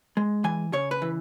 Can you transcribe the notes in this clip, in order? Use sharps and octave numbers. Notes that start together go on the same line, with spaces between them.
G#3
E3 G#5
C#3 C#5
B4
E3